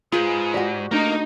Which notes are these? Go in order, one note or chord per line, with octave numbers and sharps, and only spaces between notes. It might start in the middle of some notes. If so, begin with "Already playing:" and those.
G#2 F4 G#4 B4
F#4 G4 D5 F#5
A3 A#3 D4 D#4 D#5